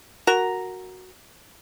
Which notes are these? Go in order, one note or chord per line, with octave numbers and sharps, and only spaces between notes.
F#4 A#4 A#5